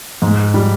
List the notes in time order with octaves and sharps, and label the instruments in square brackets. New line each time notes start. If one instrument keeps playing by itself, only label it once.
[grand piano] G#2
G3